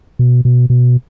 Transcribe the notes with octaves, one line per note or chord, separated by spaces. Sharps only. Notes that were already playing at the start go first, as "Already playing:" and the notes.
B2
B2
B2